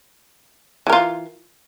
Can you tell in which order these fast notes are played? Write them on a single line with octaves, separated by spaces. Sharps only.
E3 A#4 F4